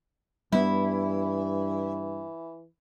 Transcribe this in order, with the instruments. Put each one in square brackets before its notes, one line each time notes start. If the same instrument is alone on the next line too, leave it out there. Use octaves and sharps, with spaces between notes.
[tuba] G2 [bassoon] E3 [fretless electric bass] G3 B3 [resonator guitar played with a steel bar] E4